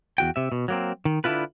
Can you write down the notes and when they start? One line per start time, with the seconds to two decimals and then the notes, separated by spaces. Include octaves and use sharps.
0.18 E2 F#4 G5
0.36 C3 E5
0.52 B2
0.68 F#3 A#3 C4
1.05 D#3
1.24 D3 D4 E4 F4 B4